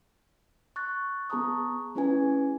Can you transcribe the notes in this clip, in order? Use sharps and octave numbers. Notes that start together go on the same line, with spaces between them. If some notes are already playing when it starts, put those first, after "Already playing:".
C#6 F#6 A6
B3 G#4 A5 A#5 C#6 D#6
A3 C#4 E4 G#4 B4 G#5